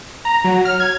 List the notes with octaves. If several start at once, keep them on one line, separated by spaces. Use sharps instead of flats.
A#5
F#3
F6
G#6